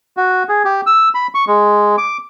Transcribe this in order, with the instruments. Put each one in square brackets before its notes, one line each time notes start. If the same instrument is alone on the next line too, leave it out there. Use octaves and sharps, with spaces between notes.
[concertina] F#4
G#4
G4
E6
B5
C#6
G#3
D6